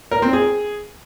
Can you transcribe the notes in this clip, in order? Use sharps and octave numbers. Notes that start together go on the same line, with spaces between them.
A#4
C4
G#4